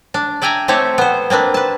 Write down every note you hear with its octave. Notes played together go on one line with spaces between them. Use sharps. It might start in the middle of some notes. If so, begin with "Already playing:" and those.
D4
D5 E5 G5 G#5 A#5
A3 C4 G4 C#5 E5
B3 C5
A#3 C4 D4 B4
B4 A5